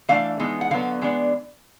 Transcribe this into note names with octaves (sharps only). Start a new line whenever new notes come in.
E3 A3 D4 F5
E3 G#3 B3 D#4
F#5
D3 F#3 B3 F5
E3 G#3 B3 D4